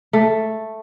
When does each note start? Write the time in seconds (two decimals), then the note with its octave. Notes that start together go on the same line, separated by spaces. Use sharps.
0.13 A3